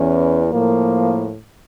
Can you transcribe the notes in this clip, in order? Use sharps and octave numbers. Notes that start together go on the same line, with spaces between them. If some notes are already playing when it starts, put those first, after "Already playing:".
Already playing: E2 E3 C#4
A2 F3 A#3